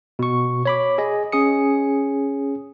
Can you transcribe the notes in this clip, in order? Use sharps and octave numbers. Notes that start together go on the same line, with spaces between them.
B2 C#6
C#5 B5 D6
G#4 D#5
C#4 G#4 D#6 C#7